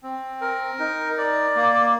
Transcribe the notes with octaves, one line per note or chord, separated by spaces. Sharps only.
C4
A#4
D#4
D5
A#3